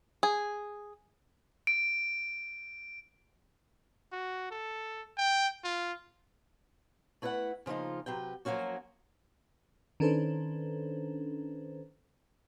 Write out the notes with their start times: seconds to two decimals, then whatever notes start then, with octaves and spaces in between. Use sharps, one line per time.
0.23 G#4
1.67 D7
4.12 F#4
4.51 A4
5.18 G5
5.64 F4
7.22 A3 E4 B4 E5 F#5
7.66 C#3 F3 A#3 D#4 F4
8.06 C3 F#3 B4 G5
8.45 F3 F#3 A3 A#3 C#4 F#4
10.00 D#3 C#4 D4 A4 B4 C5